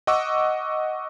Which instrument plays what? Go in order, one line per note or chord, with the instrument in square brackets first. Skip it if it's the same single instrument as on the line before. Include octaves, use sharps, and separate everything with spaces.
[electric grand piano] D#5 F#5 C#6 D6 E6